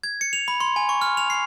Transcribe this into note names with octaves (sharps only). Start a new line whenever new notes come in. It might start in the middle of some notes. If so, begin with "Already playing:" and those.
G#6
C#7
F7
B5
C6
G#5
C#6
F6
F7
C7